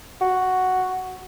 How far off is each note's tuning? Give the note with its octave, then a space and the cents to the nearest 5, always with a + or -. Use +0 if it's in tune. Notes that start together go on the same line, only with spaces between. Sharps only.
F#4 +0